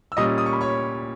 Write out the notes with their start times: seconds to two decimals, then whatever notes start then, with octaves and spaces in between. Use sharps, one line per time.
0.12 E6
0.17 A#2 G3 C#4 D#5 D#6
0.38 D#6
0.46 C#6
0.53 B5
0.61 C#5 C#6